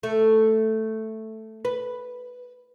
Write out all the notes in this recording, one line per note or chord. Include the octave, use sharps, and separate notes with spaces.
A3
B4